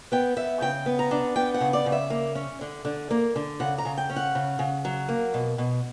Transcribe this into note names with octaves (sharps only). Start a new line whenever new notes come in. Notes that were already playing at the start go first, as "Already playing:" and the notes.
B3 G5
B3 E5
C#3 G5
B3
A#5
D4
B3 G5
F#5
C#3
D5
C#3
E5
A#3
C#4
D3
D3
A#3
D3
C#3 F#5
A#5
C#3
G5
C#4
F#5
C#3
C#3
F#3
A#3
B2
B2